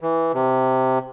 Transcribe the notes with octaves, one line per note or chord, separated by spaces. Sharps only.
E3
C3